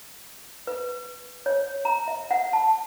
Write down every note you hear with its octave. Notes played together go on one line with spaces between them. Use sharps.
B4
C#5
A#5
E5
F#5
A5